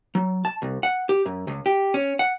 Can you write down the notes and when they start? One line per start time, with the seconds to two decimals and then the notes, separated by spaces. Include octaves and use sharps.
0.15 F#3
0.45 A5
0.62 C2
0.83 F#5
1.09 G4
1.26 F#2
1.47 C#2
1.66 G4
1.94 C#4
2.19 F#5